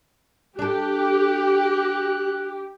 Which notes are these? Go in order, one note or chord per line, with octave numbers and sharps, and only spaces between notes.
D4 G4 A4 F#6